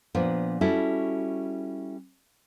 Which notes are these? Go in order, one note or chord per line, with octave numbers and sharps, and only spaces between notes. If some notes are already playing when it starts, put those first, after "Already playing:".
A#2 F3 B3 D4
G3 C#4 E4 F#4 A4